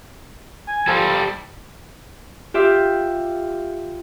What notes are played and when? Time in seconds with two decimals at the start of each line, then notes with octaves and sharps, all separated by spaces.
0.68 G#5
0.88 F3 G3 A4
2.54 F4 G4 E5